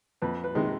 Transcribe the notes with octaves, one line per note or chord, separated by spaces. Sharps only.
F2 B4
B4
C3 D#3 G#3